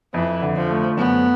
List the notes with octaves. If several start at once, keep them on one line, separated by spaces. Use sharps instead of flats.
F2 E3
D3
F3
A3
F#2 B3